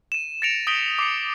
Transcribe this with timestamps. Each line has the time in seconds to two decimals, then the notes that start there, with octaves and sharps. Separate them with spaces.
0.12 D#7 E7
0.42 A6 A#6 C#7 D7 F7
0.67 D#6 G6 A#6 B6 D7 G7
0.99 D6 C7 C#7